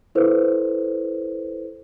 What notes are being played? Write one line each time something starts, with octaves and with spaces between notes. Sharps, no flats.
E4 A4 B4 C5